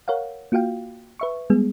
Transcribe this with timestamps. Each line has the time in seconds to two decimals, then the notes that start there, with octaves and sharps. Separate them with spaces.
0.08 A#4 C#5 F5 F#5
0.52 A#3 F4 F#4 F5 G5
1.19 B4 E5 C#6
1.50 G3 G#3 B3 G#4